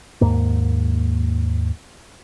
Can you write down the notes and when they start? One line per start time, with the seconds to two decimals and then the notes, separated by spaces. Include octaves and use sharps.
0.21 D#2 G#2 A#3